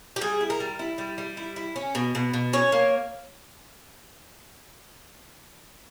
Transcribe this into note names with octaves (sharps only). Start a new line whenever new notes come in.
G4
G3 G#4
E4
A#4
G3
E4
G3
G3
E4
E4
C#4
B2
B2
B2
C#4 C#5
A#3